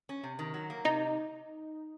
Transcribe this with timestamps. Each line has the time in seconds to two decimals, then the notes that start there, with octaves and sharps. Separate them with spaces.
0.09 C#4
0.24 C3
0.39 D#3
0.54 F#3
0.70 A#3
0.85 C3 D#4